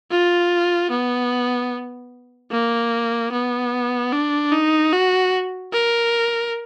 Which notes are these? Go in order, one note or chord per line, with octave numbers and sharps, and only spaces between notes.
F4
B3
A#3
B3
D4
D#4
F#4
A#4